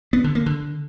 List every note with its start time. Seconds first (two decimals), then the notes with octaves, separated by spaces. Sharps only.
0.13 B3
0.24 D3
0.35 A#3
0.46 D3